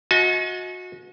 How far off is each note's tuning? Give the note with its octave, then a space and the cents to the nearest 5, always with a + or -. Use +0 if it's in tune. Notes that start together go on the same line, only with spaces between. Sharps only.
F#4 -30 D#5 +30 G#5 +40